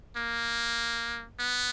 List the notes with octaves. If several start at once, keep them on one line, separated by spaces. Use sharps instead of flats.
A#3
B3